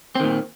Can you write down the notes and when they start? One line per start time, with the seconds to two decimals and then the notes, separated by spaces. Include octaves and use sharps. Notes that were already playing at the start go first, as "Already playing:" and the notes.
0.15 C4
0.20 D#3
0.24 A#2